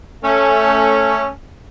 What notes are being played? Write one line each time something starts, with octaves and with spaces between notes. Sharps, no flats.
A3 C#4